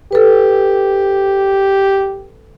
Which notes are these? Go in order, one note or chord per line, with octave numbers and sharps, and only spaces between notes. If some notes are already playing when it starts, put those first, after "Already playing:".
G4 A4 B4